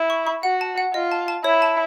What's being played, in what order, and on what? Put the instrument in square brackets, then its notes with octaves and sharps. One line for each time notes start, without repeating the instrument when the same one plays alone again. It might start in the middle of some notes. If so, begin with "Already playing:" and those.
Already playing: [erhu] E4
[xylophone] C#6
C#6
[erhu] F#4 [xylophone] F#5
[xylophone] A5
F#5
[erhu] F4 [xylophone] D#5
[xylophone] A5
A5
[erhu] E4 [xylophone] C#5
[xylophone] A5